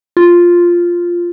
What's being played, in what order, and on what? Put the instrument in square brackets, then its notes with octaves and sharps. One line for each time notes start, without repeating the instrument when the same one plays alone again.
[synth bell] F4